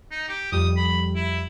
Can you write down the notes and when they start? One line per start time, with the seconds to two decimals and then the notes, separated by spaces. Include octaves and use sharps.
0.11 D#4
0.29 G4
0.52 F2 G3 D#6
0.77 B5
1.16 E4